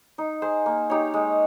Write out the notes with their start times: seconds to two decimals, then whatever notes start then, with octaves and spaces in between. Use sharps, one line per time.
0.18 D#4
0.42 G#4 C5
0.66 A#3
0.90 D#4 G4 C#5
1.14 G#3